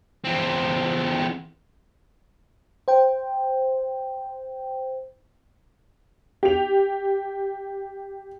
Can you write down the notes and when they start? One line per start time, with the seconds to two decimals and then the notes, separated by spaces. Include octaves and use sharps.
0.24 E2 C4
2.88 C5 G5
6.43 G4 F7